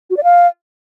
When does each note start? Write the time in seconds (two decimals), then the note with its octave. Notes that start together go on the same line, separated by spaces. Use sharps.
0.10 F#4
0.17 D5
0.24 F5